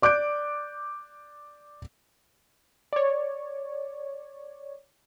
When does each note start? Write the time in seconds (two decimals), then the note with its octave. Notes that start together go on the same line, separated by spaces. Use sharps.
0.02 D5 D6 F#6 G6 D7
2.93 C#5 D5